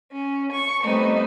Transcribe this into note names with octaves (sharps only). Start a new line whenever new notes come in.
C#4
C#6
G3 A3 B3 C4 D#4